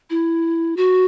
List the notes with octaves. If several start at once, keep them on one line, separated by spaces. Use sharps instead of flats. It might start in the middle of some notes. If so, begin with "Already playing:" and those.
E4
F#4